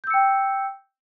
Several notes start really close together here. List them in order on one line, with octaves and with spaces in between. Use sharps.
G6 E6 C#7 G5